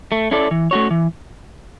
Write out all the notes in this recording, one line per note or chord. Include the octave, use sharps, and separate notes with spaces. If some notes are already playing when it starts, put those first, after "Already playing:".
A3
C#4 E4 A4 D5
E3
A3 C#4 F#4 C#5
E3